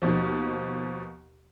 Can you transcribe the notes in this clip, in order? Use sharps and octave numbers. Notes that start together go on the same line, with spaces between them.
D#2 B2 F3